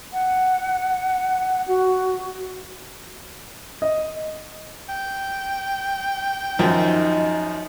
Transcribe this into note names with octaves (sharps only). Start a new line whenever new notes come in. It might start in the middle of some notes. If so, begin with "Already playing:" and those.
F#5
F#4
D#5
G5
F#2 D#3 F3 D#4